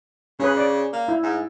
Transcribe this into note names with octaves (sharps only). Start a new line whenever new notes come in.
C#3 C#4 G#4 B4
D5
A#3
E4
G#2